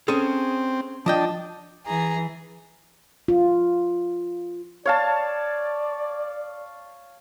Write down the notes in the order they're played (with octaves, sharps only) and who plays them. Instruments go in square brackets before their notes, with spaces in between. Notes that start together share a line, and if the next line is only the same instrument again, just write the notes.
[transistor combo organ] C4 [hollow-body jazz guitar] C#4 G#4 A4
[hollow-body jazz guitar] F3 D#5 G5 [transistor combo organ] D4 A5
[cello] E3 [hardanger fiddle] G#4 A#5
[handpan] F4
[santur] C#5 F5 A5 [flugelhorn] D5